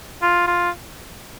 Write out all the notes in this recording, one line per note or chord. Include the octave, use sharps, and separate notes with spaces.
F4
F4